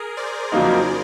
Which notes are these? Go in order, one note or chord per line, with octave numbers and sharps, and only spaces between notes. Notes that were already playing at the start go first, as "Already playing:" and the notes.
Already playing: G#4 A#4
C5 D5
F2 C#3 F#3 A#3 D#4